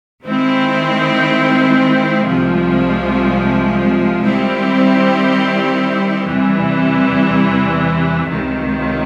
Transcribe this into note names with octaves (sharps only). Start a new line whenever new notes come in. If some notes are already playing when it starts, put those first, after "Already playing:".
D#3 G#3 C4 E4
C2 C3 F3 G#3
D#3 G3 C4 E4 G4
E2 C3 E3 G3
C#2 C3 D#3